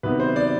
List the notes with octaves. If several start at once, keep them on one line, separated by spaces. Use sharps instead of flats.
C3 D#3 F#3 B3 B4
C5
D5